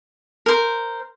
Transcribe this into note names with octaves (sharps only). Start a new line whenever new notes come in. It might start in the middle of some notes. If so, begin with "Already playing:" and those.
A#4 C5